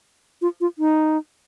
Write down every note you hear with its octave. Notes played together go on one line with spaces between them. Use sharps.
F4
F4
D#4